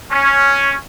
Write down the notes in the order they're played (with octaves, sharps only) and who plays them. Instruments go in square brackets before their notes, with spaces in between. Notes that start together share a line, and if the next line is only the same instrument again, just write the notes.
[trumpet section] C#4